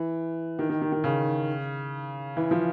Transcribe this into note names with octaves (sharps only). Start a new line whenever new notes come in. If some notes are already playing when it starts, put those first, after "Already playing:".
Already playing: E3
D#3
D#3
D#3
D#3
C#3
E3
F3